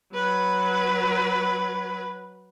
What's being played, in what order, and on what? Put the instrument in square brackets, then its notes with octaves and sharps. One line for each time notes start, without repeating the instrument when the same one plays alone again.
[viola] F#3 B4